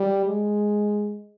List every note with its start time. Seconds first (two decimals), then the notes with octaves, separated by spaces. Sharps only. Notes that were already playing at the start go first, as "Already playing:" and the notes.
Already playing: G3
0.26 G#3